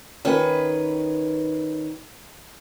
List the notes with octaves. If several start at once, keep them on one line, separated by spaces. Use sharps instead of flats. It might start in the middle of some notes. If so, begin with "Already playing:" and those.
D#3 C#4 B4